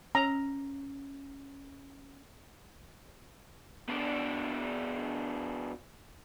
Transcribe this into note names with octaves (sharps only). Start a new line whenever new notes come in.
C#4 A#5
B2 D4